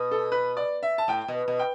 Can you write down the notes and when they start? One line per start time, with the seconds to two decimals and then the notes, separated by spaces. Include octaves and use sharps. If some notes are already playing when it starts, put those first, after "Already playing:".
Already playing: B2
0.11 A4
0.32 B4
0.57 D5
0.83 E5
0.98 A5
1.08 A2 G5
1.28 B2
1.48 B2
1.59 G5